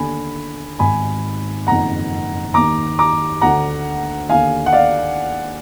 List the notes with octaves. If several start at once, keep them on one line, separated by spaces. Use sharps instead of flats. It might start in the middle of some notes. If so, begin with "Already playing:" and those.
Already playing: D#2 D3 G#5 B5
G#1 G#2 D#3 G#5 B5
F#1 F2 D#3 F#5 A#5
D#2 D#3 A#5 D6
A#5 D6
D2 D3 F#5 A#5
D#2 D3 F5 G#5
F#5
D5 F5